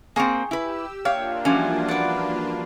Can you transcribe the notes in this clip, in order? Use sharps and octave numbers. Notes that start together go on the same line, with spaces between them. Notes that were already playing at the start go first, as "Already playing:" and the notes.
A#3 C4 G#4 C#6
E4 G4 B4 E6
A#3 D4 F4 C#5 F5 G5
E3 F3 G3 C#4 F#4 G#5
B4 D5 F#5